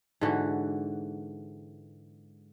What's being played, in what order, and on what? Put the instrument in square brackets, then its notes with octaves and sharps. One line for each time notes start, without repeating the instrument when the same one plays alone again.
[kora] G#2 D3 E3 F#4